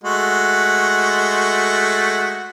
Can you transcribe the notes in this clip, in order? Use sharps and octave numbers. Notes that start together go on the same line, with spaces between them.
G#3 A3 F#4